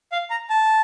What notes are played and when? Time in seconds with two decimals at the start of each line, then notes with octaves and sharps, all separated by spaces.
0.12 F5
0.30 A#5
0.50 A5